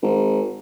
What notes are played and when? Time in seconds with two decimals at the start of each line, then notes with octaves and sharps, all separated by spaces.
0.02 G#1